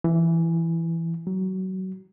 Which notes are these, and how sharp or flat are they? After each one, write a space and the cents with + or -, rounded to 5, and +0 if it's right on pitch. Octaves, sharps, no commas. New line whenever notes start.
E3 +10
F#3 +25